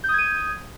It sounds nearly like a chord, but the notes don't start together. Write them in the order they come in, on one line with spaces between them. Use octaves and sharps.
G6 D#6 G#6 D#7